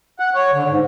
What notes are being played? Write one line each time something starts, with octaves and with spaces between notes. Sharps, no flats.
F#5
C#5
D3
G#2